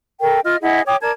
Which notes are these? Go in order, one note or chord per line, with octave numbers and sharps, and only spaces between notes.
A4 A#4 G5
F4 D#5 F6
E4 G#4 D#5 F#5
C#5 G5 D6 D#6
A#4 D5 A5 G#6